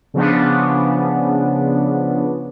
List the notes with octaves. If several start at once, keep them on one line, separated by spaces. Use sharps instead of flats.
C#3 F3 B3 D4